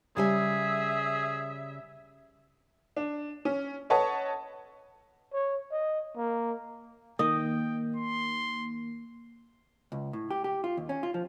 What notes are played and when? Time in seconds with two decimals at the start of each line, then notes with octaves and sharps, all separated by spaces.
0.17 C#3 G3 G#4 E5 G#5
2.97 D4
3.45 C#4
3.90 A4 B4 C#5 D#5 F#5 A5
5.33 C#5
5.72 D#5
6.17 A#3
7.19 D#3 A#3 D#5 G5
7.96 C6
9.92 C#2
10.13 A2
10.31 G4
10.44 G4
10.64 F4
10.77 D#2
10.89 C#4
11.03 F4
11.14 F3